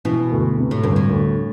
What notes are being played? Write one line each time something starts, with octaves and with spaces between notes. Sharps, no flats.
B2 E3
D2
C3
A2
D2 G2
A2
D2